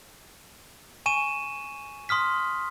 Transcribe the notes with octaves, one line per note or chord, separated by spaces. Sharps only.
G#5 C#6 D#7 E7
C6 D#6 F6 B6